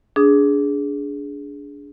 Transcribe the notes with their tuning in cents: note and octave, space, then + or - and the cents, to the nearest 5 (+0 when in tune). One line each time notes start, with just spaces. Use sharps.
D4 -25 G#4 +0 D#6 +0